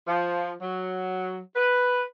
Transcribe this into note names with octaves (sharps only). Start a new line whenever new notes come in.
F3
F#3
B4